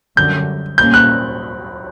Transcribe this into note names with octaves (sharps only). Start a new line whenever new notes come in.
F#2 D3 G3 G6
A#2 G3 A#3 C#4 G6
F#6